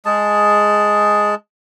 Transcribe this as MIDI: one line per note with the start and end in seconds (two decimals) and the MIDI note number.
0.05 1.35 56
0.05 1.35 68
0.05 1.35 81